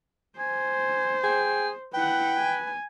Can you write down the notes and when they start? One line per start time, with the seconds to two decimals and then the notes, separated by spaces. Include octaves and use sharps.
0.39 C5 G#5
1.24 G#4 G5
1.94 E4 B4 F#5 G5
2.37 G#5